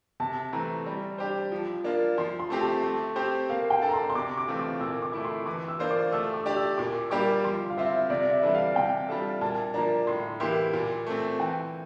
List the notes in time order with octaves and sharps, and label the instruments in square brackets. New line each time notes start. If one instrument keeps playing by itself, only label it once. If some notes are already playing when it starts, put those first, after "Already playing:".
[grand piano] C3 [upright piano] A5
[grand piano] E3 A3 C4 [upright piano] A#5
[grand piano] G3
D4 G4 C5
F3
A#3 D4 F4
[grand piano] F3 [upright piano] C6
[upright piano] C6
[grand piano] A3 C4 G4
[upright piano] A5
[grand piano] A3
C4 G4 C5
[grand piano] A#3 [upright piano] F5
[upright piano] G5
[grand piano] D4 A4 D5
[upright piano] A#5
C6
C6
[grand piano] C3 [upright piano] D6
[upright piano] D6
[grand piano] E3 A3 C4 F4
[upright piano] D6
[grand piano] A#2 [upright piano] E6
[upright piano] D6
[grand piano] A3 E4
[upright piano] C6
[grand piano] E3 [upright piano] D6
[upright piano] E6
[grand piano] A#3 D4 F4 C5
[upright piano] D6
[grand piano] A3 [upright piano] E6
[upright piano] D6
[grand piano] D4 G4 D5
[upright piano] E6
[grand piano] A#2 [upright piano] D6
[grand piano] G3 A#3 D4 G4 [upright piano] D6
[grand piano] F3 [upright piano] C6
[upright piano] F5
[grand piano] C4 F4 C5 [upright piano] E5
[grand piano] C3 [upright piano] D5
[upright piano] E5
[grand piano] E3 G3 D4 A4
[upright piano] F5
[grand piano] C3 [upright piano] G5
[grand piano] G3 D4 F4 A4
[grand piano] A#2 [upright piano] A5
[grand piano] F3 A#3 D4 [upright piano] A#5
[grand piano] A2 [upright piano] C6
[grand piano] E3 A#3 E4 G4 [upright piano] C6
[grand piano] A#2
A3 C4
[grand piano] E3 [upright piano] G5